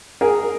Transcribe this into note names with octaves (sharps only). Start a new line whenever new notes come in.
G#4 A#4